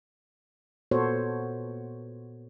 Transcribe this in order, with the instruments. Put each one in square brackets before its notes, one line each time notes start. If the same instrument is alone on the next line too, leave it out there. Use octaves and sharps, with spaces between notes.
[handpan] A#2 B3 F#4 A4 C5 C#5